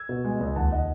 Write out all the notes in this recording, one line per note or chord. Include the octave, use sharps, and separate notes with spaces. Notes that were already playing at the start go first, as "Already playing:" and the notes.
Already playing: E6 G#6
B2
G#3
C#2
D#2 F#5 A5
D#3 D#5 F#5